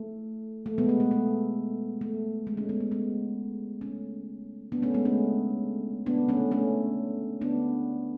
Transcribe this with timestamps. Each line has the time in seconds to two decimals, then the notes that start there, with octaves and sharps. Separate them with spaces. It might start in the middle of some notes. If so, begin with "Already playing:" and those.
Already playing: A3
0.66 A3
0.78 G#3 B3
0.89 A3
1.00 A3
1.11 A3
2.01 A3
2.47 G#3
2.57 A3 C#4
2.69 G#3 B3
2.80 A3
2.91 G#3 B3
3.81 A3 C#4
4.72 B3 D4
4.82 A3 C#4
4.94 G#3 B3
5.05 A3 C#4
6.06 B3 D4
6.29 A3 C#4
6.51 A3 C#4
7.41 B3 D4